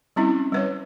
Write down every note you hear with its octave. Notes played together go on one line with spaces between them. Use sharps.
G3 C4 C#4 E4
G3 B4 C#5